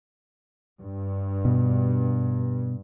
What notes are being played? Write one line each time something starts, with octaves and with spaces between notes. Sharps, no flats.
G2
B2